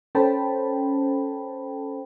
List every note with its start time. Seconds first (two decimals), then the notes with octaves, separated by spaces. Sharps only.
0.15 C#4 A4 C5 G5 A5 B5